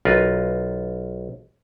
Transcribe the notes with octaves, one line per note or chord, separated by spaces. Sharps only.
B1 F4 A#4 B4